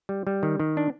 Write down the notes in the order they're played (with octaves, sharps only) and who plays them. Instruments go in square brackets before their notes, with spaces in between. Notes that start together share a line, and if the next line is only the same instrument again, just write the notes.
[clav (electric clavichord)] G3
G3
D#3
D#3
D4